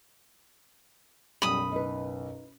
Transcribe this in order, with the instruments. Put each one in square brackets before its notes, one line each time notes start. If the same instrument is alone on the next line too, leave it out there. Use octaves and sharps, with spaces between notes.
[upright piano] F#1 B1 [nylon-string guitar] G3 [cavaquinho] B5 D#6
[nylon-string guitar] D#4 B4